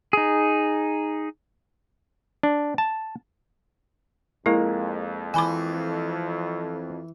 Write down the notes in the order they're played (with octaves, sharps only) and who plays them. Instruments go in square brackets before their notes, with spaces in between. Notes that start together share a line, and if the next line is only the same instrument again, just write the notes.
[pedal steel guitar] D#4 G#4
[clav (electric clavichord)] D4
A5
[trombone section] F2 [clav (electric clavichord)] G#3 A#3 A#4 [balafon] E4
[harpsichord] E3 [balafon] G#5 B5 D6